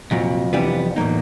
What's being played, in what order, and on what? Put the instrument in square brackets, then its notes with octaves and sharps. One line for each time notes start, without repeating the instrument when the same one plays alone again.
[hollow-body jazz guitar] C2 A#2 F#3 [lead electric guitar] F2
[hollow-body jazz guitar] C3 E3 G3 B3 D4
[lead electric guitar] E2 [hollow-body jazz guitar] A2 F#3 A#3 D#4